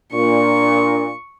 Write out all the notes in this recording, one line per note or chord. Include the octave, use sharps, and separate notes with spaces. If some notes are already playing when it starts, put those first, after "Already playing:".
A#2 D4 C#6